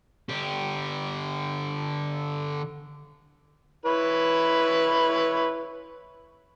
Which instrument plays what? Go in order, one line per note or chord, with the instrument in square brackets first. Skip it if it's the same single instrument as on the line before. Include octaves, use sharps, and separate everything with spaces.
[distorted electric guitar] D3 G4
[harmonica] E4 B4 C#5